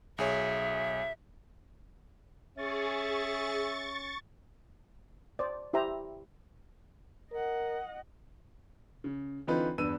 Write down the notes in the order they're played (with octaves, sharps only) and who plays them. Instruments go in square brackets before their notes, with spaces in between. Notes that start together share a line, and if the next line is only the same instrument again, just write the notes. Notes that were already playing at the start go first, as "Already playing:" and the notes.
[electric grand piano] B1 G#4 C#5 [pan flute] E5
[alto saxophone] C#4 [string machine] G#4 [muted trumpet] E5 [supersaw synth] C#6 A6
[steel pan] C5 D5
E4 G4 C5 E5 A#5
[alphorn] A#4 [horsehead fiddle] D#5 F#5
[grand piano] C#3
D3 E3 C4 D#4 F4 B4
E2 G2 B4 E6 D#7